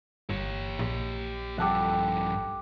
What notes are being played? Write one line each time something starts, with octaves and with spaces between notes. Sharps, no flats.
G1 G4 C#5
A#1
G2 F3 G4 A4 F#5